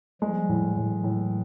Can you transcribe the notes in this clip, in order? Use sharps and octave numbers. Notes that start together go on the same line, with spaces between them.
F3 G3 G#3
A2
A2 E3 F#3
A2